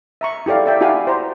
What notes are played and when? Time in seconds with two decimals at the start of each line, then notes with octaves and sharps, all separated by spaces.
0.21 E5 A#5 C#6
0.46 E4 G4 A4 D5 F5
0.65 A4 D5 E5 G5
0.81 E4 F#4 G4 F5 G#5
1.07 C5 A#5